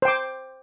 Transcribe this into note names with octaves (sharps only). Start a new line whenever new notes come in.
C5 G5 D6